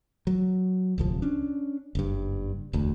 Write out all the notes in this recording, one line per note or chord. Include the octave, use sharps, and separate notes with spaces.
F#3
D1 C2 F3
C#4 D4
F#1 G2
E1 D2